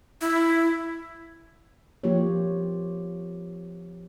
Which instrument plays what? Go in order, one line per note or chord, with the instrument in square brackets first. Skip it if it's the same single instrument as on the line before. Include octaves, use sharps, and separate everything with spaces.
[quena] E4
[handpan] F3 A#3 F4 G4 C#5